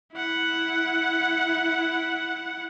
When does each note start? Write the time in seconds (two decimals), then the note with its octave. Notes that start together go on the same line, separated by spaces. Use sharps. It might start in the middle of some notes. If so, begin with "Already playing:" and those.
0.14 E4 F#5